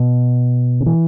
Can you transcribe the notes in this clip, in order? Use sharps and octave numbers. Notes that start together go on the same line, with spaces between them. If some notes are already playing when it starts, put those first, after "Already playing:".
Already playing: B2
C#3
E3